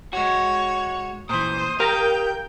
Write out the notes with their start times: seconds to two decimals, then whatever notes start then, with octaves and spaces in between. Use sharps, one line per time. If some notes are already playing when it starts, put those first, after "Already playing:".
0.13 G#3 F#4 C#5
1.29 A#2 E3 C5 D#6
1.80 G4 A#4 F5 G5